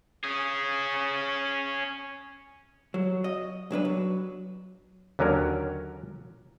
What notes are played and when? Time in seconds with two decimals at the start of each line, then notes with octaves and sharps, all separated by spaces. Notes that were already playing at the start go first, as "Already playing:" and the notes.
0.24 C#4 G#4
2.94 F#3
3.24 D#5
3.71 B1 F#3 D4 B4
3.85 F#3
5.19 D#2 D3 F#3 C#4 A#4